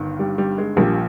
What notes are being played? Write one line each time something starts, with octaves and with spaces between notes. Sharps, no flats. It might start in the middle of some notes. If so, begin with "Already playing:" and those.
Already playing: G1 G2 D#3
G3
G3
G#3
A#1 A#2 F3 G3